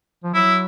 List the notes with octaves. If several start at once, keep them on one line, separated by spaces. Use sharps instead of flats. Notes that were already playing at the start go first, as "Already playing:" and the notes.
F3
F#3 E4